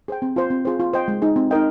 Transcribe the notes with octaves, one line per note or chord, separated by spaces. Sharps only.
G#4 C5 G5
C4
F4 C5
C4
F4 G#4 C5
F4
C5 D#5 G5
G#3
D#4 G#4
C4
D#4 A#4 D#5 G5